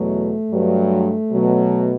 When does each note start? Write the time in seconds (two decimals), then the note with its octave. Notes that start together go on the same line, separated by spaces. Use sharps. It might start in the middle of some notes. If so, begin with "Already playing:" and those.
Already playing: E2 B2 F#3 A3
0.51 G2 F#3
1.30 B2 F#3